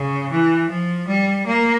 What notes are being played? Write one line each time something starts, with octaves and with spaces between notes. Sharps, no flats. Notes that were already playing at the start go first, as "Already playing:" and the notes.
Already playing: C#3
E3
F3
G3
A#3